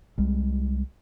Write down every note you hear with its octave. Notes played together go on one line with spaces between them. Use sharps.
C2 G3 G#3